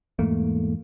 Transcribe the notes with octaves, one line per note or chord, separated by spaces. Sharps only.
E2 G#2 A3 A#3